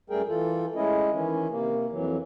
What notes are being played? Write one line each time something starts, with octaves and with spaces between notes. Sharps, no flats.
F#2 G3 A3 G#4 A#4 G5
E3 F4 A4
G#3 A3 C#4 E4 D#5
D#3 E3 C#4
C3 A#3
F2 E3 F#3